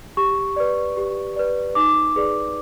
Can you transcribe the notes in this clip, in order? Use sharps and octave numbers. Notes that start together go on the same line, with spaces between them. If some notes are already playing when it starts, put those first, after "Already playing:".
G4 C#6
B4 D5
G4
B4 D5
D#4 D6
G#4 B4 D5